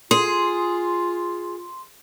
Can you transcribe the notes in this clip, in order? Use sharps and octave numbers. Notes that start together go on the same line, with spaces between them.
F4 G#4 C6